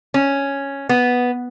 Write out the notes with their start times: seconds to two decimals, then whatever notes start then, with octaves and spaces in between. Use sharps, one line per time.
0.14 C#4
0.89 B3